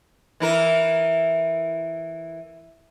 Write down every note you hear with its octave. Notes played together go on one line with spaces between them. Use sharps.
E3 E4 A#4